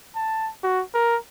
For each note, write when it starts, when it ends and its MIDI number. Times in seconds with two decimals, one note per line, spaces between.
0.15 0.50 81
0.63 0.82 66
0.94 1.17 70